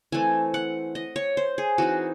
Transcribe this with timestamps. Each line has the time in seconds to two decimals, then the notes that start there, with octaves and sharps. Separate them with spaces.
0.12 E3 A3 C4 G#5
0.54 F#5
0.95 D#5
1.16 C#5
1.37 C5
1.58 G#4
1.78 E3 C4 D#4 F#4